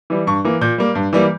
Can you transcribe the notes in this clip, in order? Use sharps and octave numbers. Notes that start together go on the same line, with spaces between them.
E3 G3
G2 C#6
E3 A#3
A#2 G6
G3 A#3
G2
E3 G3 A#3